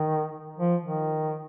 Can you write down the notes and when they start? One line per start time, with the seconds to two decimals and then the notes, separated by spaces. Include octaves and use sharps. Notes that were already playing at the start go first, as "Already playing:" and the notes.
Already playing: D#3
0.58 F3
0.84 D#3